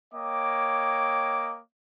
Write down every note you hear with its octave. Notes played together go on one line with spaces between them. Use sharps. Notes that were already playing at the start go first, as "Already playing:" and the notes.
A#3 C#5 D#5 G5 D6